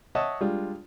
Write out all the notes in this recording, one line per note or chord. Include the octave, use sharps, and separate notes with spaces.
C#5 D#5 E5 F#5 A5
G3 G#3 D4 F4